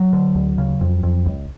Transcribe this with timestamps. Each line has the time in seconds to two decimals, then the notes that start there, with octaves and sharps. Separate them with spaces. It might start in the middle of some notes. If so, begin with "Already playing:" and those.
Already playing: F#3
0.13 D3
0.35 D2
0.58 C#3
0.81 F2
1.03 F2
1.26 C#2